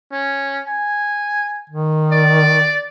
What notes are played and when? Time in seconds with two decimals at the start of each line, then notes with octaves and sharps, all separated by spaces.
0.12 C#4
0.67 G#5
1.70 D#3
2.12 D5